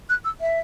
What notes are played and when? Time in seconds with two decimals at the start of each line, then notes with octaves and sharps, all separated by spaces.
0.09 F#6
0.25 E6
0.41 E5